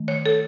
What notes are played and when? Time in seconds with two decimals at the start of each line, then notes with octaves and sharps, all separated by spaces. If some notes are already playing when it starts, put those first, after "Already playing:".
Already playing: D#3 A3
0.08 C#5
0.26 A4